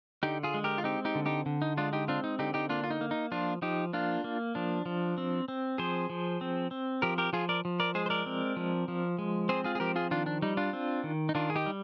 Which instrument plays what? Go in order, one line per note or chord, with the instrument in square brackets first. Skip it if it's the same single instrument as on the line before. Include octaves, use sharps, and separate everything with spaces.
[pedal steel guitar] D3 D#4 G4
F4 G#4
G#3
G4 A#4
F4
C4 D#4 G4
D#4 G4
D3
D#4 G4
D3
D#4
G#3 D4 F4
D#4 G4
C4 D4 F4
D#4
D3 D#4 G4
D#4 G4
A#3 D4 F4
F4
D#4
A#3
D#4
F3 D4 F4
F3 D#4 G4
A#3 D4 F4
A#3
F3 D4
F3
C4
C4
F3 G#4 C5
F3
C4
C4
F3 G4 A#4
G4 A#4
F3 F4 G#4
A#4 D5
F3
A#4 D5
G#3 G#4 C5
C5
A#4 D5
C4
F3
F3
G#3
C4 G#4 C5
F4 G#4
G#4
F3 G4 A#4
F4 G#4
D#3 D4 F4
D4
G3 D#4
D4 F4
C4
D#3
D#4
D#3 D4 F4
G#4
D#4 G4
G3